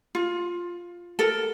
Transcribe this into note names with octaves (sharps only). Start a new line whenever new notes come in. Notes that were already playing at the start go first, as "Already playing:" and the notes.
F4
A4 A#4